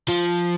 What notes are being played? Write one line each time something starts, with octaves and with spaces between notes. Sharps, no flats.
F3